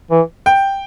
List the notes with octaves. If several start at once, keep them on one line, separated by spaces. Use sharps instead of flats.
E3
G5